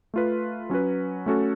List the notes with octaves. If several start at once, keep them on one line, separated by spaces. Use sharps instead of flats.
A3 F4 B4
F#3 C#4 F#4 B4
A3 C#4 F#4 A4